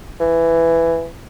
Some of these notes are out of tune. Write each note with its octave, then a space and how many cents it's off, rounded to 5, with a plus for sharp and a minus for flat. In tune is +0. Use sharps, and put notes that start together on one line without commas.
E3 +10